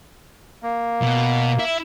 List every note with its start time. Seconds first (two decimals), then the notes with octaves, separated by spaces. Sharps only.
0.63 A#3
1.02 B2
1.59 E4